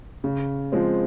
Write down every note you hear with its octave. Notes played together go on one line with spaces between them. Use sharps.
C#3
F3 G#3 C4